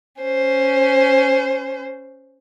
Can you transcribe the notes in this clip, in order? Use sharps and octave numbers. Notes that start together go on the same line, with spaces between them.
C#4 C5